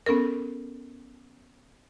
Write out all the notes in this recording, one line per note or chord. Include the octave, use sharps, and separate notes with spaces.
B3 C#4 A4 A#4